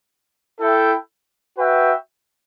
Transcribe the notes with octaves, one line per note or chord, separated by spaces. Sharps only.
E4 A4 E5 G5
F#4 B4 E5 G5